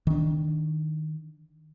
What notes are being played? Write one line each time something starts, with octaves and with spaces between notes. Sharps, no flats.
D#3 D4